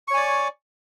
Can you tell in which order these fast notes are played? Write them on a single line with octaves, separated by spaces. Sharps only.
C#6 C#5 G#5 D5